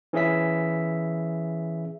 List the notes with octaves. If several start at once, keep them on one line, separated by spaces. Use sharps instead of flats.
E3 C#4 G#4 E5 B6